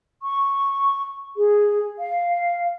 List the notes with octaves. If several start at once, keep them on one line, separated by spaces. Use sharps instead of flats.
C#6
G#4
F5